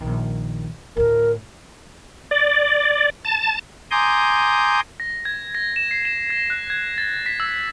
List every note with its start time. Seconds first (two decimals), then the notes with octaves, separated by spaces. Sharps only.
0.01 A#1 D#3
0.97 D2 A2 A#4
2.31 D5
3.25 A5
3.91 G#5 A#5 C6 D6 D#6 G6
5.00 A#6
5.25 G#6
5.55 A#6
5.76 E7
5.91 C7
6.05 E7
6.30 A#6
6.50 F#6
6.70 G#6
6.98 A6
7.26 B6
7.40 E6